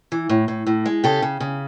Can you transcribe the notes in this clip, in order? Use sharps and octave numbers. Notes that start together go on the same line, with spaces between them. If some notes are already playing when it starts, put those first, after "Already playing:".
E3
A2
A2
A2
G#3
C#3 G4 A4
C#3
C#3